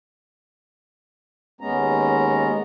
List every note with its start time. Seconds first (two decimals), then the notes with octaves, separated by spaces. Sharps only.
1.61 D#2 G#3 B3 C#4 A#5